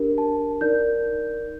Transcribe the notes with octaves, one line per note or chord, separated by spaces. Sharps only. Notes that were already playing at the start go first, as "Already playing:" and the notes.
Already playing: D4 G4 A#4
A5
D#4 A#4 D5 G6